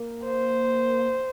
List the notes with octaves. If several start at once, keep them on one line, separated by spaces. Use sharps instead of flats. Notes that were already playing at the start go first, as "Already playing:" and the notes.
Already playing: A#3
C5